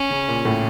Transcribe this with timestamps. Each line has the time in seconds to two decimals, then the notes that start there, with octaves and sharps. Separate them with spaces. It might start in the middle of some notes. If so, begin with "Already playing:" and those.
Already playing: C#4
0.10 C#3
0.28 A#2
0.45 A2